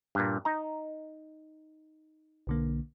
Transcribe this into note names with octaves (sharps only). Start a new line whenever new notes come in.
G2 A#2
D#4 A#5
B1 D3 A#3